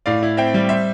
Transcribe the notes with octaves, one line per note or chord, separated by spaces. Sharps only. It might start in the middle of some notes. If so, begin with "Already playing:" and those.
A2 D5 F5
E4
C4 E5 G5
G3
C5 E5